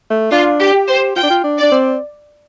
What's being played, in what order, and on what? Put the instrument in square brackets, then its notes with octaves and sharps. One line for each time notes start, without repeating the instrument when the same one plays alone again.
[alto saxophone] A3
[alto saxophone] D4 [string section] F4
[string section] G4
[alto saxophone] G4
[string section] C5
[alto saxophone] F4 [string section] G5
[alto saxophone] D4
F4
D4
[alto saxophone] D4 [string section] D5
[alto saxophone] C4